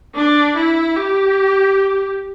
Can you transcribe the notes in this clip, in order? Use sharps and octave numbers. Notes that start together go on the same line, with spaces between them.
D4
E4
G4